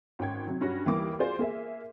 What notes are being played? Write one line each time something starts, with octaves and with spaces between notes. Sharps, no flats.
G#1 C#4 G5 G#6
C3 F#3
G2 C#4 F#4 A#6
D#2 E3 G3 A#3 D6 D#6
C4 F4 F#4 G#4 C5 D5
A#3 G#4 E5